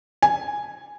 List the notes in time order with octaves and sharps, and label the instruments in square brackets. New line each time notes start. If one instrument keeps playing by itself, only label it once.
[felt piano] G#5